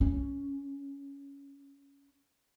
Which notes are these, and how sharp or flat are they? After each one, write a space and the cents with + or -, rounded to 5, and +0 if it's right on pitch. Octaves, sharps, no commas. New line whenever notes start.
C#4 +10